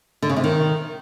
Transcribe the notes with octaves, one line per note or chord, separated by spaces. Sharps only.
D3
C#3
C3
D#3